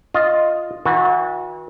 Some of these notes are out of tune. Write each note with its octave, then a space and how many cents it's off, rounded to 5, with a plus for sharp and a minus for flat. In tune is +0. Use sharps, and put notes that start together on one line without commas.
F4 +0 D#5 +0
E3 -45 F#4 -30